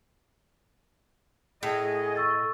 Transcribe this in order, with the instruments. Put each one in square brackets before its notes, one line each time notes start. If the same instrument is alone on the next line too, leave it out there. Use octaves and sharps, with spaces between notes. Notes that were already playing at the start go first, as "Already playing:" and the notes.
[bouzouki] A2 [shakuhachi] G#4 [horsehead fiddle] D#5
[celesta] C#6 E6 A6